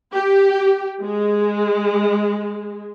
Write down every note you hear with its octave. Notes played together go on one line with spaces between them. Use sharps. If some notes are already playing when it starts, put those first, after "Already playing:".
G4
G#3